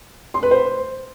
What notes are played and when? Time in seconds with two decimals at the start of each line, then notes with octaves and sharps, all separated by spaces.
0.34 C6
0.43 B4
0.51 C5